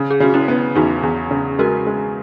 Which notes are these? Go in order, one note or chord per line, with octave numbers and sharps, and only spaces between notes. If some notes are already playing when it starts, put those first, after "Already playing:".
Already playing: C#3
G#4
C#3 F#4
C#4 E4
B3
E2 D#4 F#4
E2
C#3
G#3 F#4 A#4
G#3